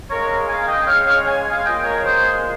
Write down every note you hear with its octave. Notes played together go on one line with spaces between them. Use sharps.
C#3 G#3 A#4 C#5
F5 G#5
D#5 G5
C#5 F5
C#5 F5
G#5
F5 G#5
A#2 G#3 D#5 G5
A#4 C#5
G#4 C5